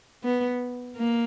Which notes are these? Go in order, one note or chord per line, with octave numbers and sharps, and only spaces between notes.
B3
A#3